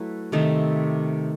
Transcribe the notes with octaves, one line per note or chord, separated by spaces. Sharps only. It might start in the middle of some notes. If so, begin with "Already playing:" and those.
Already playing: F#3 A3 E4 B4
C3 D#3 A3